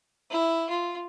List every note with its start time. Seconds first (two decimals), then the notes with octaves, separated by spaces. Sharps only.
0.30 E4
0.69 F4